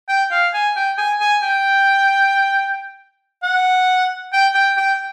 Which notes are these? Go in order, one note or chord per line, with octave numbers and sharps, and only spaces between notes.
G5
F5
G#5
G5
G#5
G#5
G5
F#5
G5
G5
G5